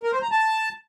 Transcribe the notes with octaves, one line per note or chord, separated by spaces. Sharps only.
A#4
C5
A#5
A5